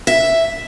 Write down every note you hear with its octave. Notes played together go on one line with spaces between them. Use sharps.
E5